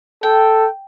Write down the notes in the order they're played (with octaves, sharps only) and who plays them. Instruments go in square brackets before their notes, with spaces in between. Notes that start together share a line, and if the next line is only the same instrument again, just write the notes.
[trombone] A4 [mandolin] G5